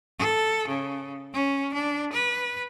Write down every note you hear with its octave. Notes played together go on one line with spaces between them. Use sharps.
A4
C#3
C#4
D4
B4